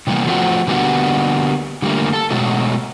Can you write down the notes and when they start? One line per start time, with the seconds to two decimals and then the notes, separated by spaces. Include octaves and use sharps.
0.07 C3 E3 G3 A#3 B3
0.27 F3 A3 C4 F4 F#4
0.67 D3 G3 A#3 B3 F#4
1.82 D3 G3 A3 A#3
2.13 A4 A5
2.30 B2 F#3 G#3 A3